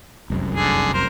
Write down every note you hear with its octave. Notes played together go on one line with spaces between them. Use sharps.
F1 C2 F#2
D3 G#4
A#4 C5